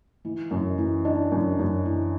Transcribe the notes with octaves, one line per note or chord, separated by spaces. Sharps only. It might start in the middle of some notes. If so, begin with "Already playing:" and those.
E3
F#2
E3
D4
F#2
F#2
E3